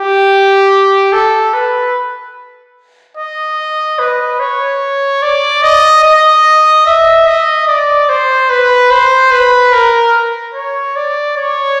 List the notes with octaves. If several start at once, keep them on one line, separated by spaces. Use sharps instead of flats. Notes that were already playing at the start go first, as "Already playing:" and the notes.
Already playing: G4
A4
B4
D#5
B4
C#5
D5
D#5
D#5
E5
D#5
D5
C5
B4
C5
B4
A#4
C#5
D5
C#5